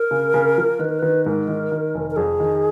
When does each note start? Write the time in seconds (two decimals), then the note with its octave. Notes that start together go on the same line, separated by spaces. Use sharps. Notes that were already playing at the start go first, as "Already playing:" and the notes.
Already playing: A#4
0.11 C#3
0.34 C#3
0.58 F3
0.79 D#3 B4
0.90 A#4
0.99 D#3 B4
1.26 G#2 A#4
1.48 D#3
1.72 D#3
1.95 F1
2.11 A#4
2.16 F2 G#4
2.40 D#3